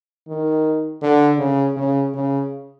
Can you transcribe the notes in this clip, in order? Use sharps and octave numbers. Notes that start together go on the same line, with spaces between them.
D#3
D3
C#3
C#3
C#3